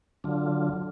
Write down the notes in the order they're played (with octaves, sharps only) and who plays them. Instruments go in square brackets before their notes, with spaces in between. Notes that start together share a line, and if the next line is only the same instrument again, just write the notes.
[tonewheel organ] D3 F#3 D4 F4